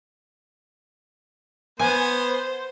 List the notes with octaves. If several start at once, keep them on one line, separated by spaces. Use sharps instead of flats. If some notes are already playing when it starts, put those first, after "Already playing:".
B3 C5 G#5